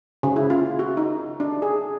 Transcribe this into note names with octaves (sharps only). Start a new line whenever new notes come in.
C#3
E4
F4
F#4
D#4
D4
G#4